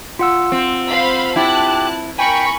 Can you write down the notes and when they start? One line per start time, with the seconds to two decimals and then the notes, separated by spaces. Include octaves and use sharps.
0.19 F4 F#5 E6
0.52 C4
0.88 C5 F5 B5
1.36 E4 G4 A5 F#6
2.19 A#4 G5 G#5 B5 C#6 C#7